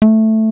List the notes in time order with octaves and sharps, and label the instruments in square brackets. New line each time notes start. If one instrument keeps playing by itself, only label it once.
[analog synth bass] A3